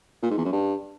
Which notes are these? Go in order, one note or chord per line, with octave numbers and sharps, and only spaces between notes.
A#2
G#2
E2
F#2
G2